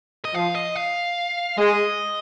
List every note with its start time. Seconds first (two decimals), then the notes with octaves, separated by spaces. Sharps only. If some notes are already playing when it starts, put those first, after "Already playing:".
0.25 D#5
0.34 F3 F5
0.55 D#5
0.76 F5
1.57 G#3 D#5